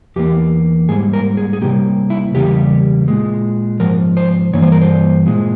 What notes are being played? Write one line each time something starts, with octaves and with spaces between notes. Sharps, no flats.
E2 E3 A#3 G4
G#2 G3 A#3 G#4
A#4
G#4
G#4
C3 G3 A#3 G4
E4
E2 C#3 G3 A#3 G4
A#2 G#3
G#2 F3 A#4
C5
G2 E3 A#3 C#5
C5
A#4
C5
A#2 G#3